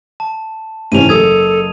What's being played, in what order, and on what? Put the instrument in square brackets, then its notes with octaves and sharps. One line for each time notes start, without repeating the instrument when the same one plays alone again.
[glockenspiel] A5
[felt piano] G#2 C3 E3 [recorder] C#4 [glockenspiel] D#7 F7
[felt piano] F#1 [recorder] A4 [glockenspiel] D#6 G#6